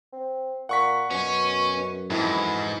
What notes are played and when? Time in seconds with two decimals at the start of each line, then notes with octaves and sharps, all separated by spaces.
0.13 C4
0.69 A#2 F#5 C#6 B6
1.11 F#2 B2 C#4
2.10 F2 G#2 E3 E4